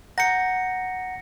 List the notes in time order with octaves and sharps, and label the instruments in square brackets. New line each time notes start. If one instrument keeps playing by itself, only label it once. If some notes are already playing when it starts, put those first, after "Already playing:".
[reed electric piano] F#5 A#5 G6 [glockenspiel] A#6 C#7